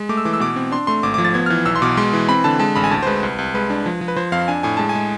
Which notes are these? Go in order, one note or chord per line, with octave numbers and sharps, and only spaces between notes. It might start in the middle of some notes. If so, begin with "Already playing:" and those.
Already playing: G#3
A3 D6
E6
E3 D6
E6
B2 D6
C4
D4 C6
A3 C6
G#1 D6
F3 D6
A6
B3 G#6
F6
E3 G#6
B1 E6
C6
B2 D6
G#3 C6
E3
C4 B5
D3 A5
G#3 A5
A1 B5
G#5
D2 A5
C5
G#3 B4
C2
C2
G#3 B4
D4
F3
F3
B4
F3 C5
F2 F5
D4 G#5
A2 G#5
G#3 A5
G#5
G#3